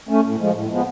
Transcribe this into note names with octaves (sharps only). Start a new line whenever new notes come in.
A3 C#4
A2
F3 G#3
A2
F3 G#3 B3